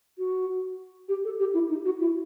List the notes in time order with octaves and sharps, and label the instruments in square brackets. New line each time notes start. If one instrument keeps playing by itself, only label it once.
[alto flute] F#4
G4
A4
G4
E4
D#4
F#4
E4